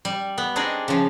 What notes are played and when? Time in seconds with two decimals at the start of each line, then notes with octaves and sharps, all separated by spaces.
0.05 G3
0.38 B3
0.56 C4 D4 D#4 G#4 D5 A#5
0.88 C#3 F3